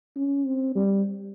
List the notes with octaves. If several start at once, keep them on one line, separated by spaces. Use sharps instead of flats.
C#4
C4
G3